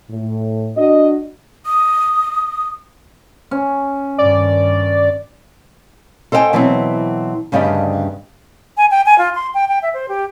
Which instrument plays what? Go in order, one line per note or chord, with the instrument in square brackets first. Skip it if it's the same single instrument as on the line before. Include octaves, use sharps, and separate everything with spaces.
[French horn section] A2
[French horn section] D4 F#4 [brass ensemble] D#5
[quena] D#6
[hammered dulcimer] C#4
[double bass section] G2 D#3 [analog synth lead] D5
[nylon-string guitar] A4 C5 D#5 E5 G5 G#5
B2 E3 F#3 B3 C4
D2 G2 C#3 G4 D5 D#5
[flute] G#5
G5
G#5
F4
C6
G5
G5
E5
C5
G4